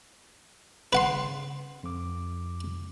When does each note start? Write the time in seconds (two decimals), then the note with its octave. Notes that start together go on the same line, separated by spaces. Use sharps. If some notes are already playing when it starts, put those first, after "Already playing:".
0.93 C#3 B4 F#5 C6
1.83 F2 D6